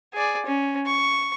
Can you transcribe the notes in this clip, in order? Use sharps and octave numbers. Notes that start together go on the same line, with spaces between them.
G#4 D5
C#4
C#6